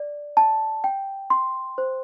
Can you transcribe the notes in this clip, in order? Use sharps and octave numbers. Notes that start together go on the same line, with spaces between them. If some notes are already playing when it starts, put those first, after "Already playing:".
Already playing: D5
A5
G5
C6
C5